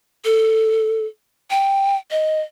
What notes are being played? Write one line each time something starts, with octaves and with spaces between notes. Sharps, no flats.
A4
G5
D#5